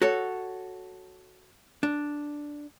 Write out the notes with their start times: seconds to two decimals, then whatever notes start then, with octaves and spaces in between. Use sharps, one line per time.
0.02 F#4 A4 C#5
1.83 D4